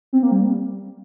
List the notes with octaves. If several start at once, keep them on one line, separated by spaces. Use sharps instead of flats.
C4
A#3
G3